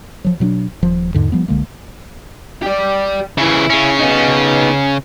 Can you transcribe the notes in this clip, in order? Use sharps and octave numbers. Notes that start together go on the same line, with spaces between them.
F3 F#3
B2 F#3 C#4 D4
D#1 F3
E2 G#2 D3
F3 G3 B3
C2 D3 G#3 A#3
G4 D5
C#3 E3 E4
C#3 C#4
B3 D#4